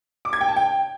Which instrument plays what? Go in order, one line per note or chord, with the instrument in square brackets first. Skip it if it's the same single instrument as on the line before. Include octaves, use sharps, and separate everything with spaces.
[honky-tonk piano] D6
G#6
G5
A5
G5